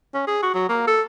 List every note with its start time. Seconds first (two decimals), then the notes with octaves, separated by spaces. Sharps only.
0.14 C#4
0.27 G#4
0.43 F#4
0.54 F#3
0.69 A#3
0.87 A4